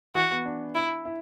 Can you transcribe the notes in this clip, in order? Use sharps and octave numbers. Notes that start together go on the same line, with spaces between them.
E3 F#4
B3
D4
E4
E4